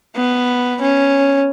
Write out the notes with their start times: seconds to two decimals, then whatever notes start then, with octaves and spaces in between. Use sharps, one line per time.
0.16 B3
0.81 C#4